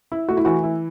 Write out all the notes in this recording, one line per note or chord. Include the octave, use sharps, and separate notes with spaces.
E4
A3 F#4
E4
E3 F#4
E4